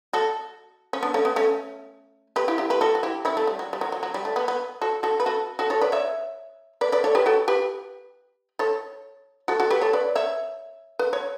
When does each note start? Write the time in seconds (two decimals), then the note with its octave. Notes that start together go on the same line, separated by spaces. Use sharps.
0.13 F#4 A4
0.93 C#4
1.03 B3 D4
1.14 A3 C#4
1.25 B3
1.36 A3 C#4
2.36 G4 B4
2.48 E4 G4
2.58 E4 G4
2.70 G4 B4
2.81 F#4 A4
2.95 F#4
3.03 E4 G4
3.25 C#4 E4
3.37 A3
3.47 G3
3.59 F#3
3.73 G3
3.81 F#3
3.92 F#3
4.03 F#3
4.14 G3
4.25 A3
4.36 B3
4.48 B3
4.81 F#4 A4
5.03 F#4 A4
5.20 B4
5.26 F#4 A4
5.59 F#4 A4
5.70 A4 C#5
5.81 B4 D5
5.92 C#5 E5
6.81 B4 D5
6.92 B4 D5
7.04 A4 C#5
7.15 G4 B4
7.26 F#4 A4
7.48 G4 B4
8.59 A4 C#5
9.48 F#4 A4
9.60 F#4 A4
9.70 G4 B4
9.81 A4 C#5
9.93 B4 D5
10.15 C#5 E5
10.99 B4
11.13 C#5